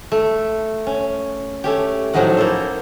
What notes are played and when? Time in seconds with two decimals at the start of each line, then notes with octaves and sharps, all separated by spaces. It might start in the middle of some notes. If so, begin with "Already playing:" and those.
0.12 A3
0.87 C#4
1.64 A3 C#4 G4
2.13 A2 F3 F#3 C#4 D#4 F#5
2.37 A#3 E4 A4 C5